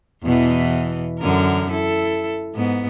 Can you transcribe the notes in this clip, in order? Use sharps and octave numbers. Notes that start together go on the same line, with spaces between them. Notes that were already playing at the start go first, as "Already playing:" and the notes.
E2 B2 E3
F#2 D3 A#4
E4 A4
G#2 B3